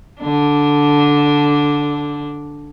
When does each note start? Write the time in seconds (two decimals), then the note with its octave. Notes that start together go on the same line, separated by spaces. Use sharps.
0.21 D3 D4